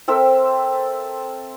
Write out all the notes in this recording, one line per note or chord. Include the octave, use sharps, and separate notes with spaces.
C4 A4 A#4 E5